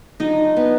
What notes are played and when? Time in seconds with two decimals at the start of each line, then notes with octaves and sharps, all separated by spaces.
0.20 F#3 D4 D#4 F4 D#5
0.56 B3 B4